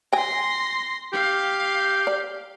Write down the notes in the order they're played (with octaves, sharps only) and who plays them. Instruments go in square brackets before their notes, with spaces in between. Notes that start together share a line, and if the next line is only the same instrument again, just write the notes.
[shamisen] G5 G#5 [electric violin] C6 A#6
[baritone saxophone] G4 [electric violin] F5
[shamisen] D5